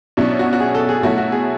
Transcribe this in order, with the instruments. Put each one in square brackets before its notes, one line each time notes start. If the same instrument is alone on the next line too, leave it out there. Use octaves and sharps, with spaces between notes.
[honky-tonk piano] B2 F#3 C#4 E4 [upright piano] D4
[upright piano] F#4
F#4
G#4
A4
G#4
[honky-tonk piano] B2 F#3 A3 E4 [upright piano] F#4
[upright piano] F#4
G#4